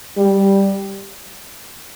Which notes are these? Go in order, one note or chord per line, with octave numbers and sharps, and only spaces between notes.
G3